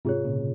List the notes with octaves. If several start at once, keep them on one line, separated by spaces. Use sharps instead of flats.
G#2 C3 F4 G#4 C#5
A#2 C#3